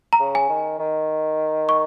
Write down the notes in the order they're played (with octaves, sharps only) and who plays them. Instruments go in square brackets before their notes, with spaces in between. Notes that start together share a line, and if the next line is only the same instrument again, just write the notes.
[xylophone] A#5
[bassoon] C#3
[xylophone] G#5
[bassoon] D#3
D#3
[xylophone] C#6